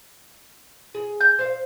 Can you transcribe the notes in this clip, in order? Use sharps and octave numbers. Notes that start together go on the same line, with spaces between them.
G#4
G6
C5 F5